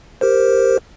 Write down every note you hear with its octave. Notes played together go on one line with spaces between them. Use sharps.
G4 A#4 C5